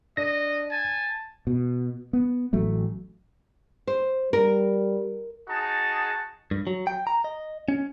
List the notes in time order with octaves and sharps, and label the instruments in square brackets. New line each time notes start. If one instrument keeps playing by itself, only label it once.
[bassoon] D4 [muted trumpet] D#5 [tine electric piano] A#6
[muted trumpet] G#5 [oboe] A5
[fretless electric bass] B2
B3
A1 F#3 A3
[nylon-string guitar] C5
[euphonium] G3 [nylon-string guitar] A#4
[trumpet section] D#4 F#4 G#4 A5
[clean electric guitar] G2
F#3
G5
A#5
D#5
C#4